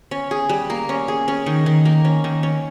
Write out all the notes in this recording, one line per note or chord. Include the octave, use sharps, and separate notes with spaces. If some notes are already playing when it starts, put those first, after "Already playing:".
C#4
G#4
G3
A#3
C#4
G#4
C#4
D#3
D#3
A#3
C#4
D#3
C#4